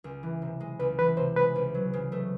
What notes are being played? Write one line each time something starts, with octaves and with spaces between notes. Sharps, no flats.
C#2
E3
C3
G#3
C#2 B4
E3 B4
C3 C5
G#3 B4
C#2
F#3
C#3
A3